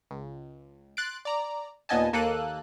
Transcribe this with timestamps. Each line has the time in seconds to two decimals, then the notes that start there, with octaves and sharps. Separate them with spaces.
0.11 C#2
0.97 C6 F#6 A6 C7 D7
1.25 D5 A#5
1.89 D#2 A#2 B3 D#5 G#5 A5
2.13 D#2 A#3 A4 F#6 D#7